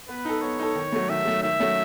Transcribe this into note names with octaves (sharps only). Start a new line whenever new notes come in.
B3 B4
D#4 A4
B3 C#5
D#4 A4
D#3
F#3 A3
D#3 E5
F#3 A3
D#3 E5
F#3 A3 C#4